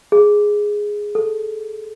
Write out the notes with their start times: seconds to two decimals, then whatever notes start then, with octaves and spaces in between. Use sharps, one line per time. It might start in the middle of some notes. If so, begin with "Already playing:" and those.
0.12 G#4
1.15 A4